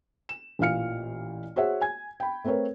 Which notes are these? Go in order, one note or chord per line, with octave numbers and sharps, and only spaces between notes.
E7
A1 A#2 E3 F5 F6 C#7
F#4 G#4 C5 C#5 E5 F#5
G#5 G#6
G5 B5
A3 C4 A#4 B4 C#5